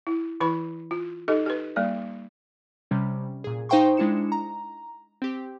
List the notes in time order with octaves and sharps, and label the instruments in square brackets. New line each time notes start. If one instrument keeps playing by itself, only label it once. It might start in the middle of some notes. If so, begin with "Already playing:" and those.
[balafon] E4
E3 E4 B4 B5
F4
D#4 G4 A4 D#5
G4 B4
G3 A#3 D5
[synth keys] C3 G3 C#4
A#2 G#4
D#4 C5 F5 G5 C6 C#6
G#3 D4 E4 C#7 E7
A#5
C4 G4